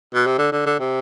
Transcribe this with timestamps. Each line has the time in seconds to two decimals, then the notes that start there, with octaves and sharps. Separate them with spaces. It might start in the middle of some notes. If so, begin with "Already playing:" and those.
0.14 B2
0.26 C3
0.38 D3
0.52 D3
0.66 D3
0.80 C3